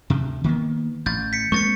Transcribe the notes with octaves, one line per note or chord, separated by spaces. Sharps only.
D2 C3
D#3 A#3 B3
A1 G6 A6
B6 C#7
G#3 A#3 C4 C#6 A6 C#7